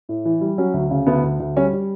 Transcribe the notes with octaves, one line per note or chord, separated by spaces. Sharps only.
A2
E3
G3
F#3 C#4
D2
C#3
D2 B3
D2
D2
G3 C#4
G3